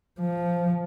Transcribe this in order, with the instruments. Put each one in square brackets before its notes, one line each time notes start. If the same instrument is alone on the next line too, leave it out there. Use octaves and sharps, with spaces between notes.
[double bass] F3